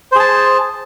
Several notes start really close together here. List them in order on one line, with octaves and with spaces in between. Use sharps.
C5 G#4 A5